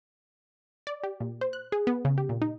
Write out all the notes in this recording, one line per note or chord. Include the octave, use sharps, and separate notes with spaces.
D5
G4
A#2
C5
F#6
G#4
B3
C#3
G4
A#2
D#4